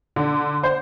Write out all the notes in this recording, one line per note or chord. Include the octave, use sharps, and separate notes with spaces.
D3
C5